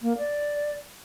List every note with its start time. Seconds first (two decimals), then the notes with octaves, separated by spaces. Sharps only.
0.02 A#3
0.18 D5